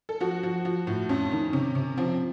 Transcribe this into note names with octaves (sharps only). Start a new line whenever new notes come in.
A4
F3 F#4
F3
F3
A2
F2 C#4
D#3
C3 C#4
C3
F3 C4